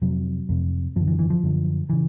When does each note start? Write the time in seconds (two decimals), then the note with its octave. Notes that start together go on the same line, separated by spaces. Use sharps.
0.02 F2 C3 F#3
0.49 F2 C3
0.96 F#2 D3 F3
1.07 E3
1.19 E3
1.30 F3
1.43 F#2 D3
1.90 C#3 E3